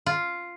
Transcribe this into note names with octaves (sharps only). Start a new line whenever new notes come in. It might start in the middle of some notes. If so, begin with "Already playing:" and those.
F4